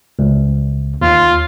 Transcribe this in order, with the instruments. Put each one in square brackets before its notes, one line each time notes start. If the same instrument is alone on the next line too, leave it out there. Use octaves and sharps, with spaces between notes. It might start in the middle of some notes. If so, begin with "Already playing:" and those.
[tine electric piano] C#2
[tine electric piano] D#2 [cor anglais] F4